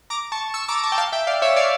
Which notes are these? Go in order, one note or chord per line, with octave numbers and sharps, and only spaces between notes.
A#5 D6
A5 C#6
C#6 E6
A#5 D6
A5 C#6
G5
F5 A5
E5 G5
D5 F5
C#5 E5
D5 F5